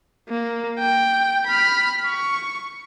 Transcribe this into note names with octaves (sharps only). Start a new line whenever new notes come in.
A#3
G5
B5 F6
C#6